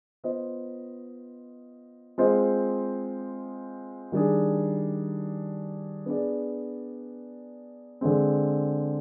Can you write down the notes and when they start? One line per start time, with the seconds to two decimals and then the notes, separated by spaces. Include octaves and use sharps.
0.24 B3 F4 C5 D#5
2.18 G#3 C4 F4 C5 D#5
4.12 D#3 G3 D4 G#4
6.06 B3 D4 G#4 D5
8.01 D3 G#3 C4